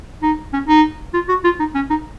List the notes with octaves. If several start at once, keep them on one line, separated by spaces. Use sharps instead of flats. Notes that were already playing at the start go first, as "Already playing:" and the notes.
D#4
C#4
D#4
F4
F#4
F4
D#4
C#4
D#4